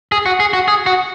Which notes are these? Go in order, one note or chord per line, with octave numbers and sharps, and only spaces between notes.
G#4
F#4
G#4
F#4
G#4
F#4